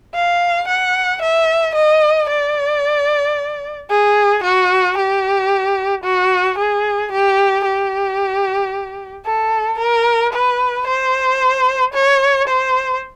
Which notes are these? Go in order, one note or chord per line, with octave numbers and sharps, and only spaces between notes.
F5
F#5
E5
D#5
D5
G#4
F#4
G4
F#4
G#4
G4
G4
A4
A#4
B4
C5
C#5
C5